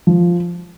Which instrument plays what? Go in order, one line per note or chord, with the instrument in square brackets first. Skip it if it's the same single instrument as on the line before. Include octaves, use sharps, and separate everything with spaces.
[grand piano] F3